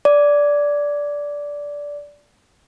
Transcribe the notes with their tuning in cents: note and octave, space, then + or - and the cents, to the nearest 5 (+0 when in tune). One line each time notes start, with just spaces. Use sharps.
D5 -10